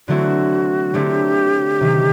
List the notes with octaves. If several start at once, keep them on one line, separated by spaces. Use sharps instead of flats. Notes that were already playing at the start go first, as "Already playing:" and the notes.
D3 F#3 A3 C4 E4 F#4
D3 F#3 A3 C4 E4 G4
C3 D#3 F#3